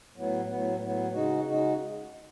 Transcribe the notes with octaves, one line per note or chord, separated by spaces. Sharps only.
A2 F#3 B3
A2 F#3 B3
A2 F#3 B3
C#3 G#3 D#4 F#4
C#3 G#3 D#4 F#4